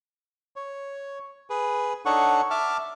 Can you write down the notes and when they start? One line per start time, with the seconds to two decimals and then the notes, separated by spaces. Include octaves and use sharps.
0.56 C#5
1.50 G#4 B4
2.06 D4 D#4 A4 C#5 F#5 C#6
2.50 E5 A5 D6 F6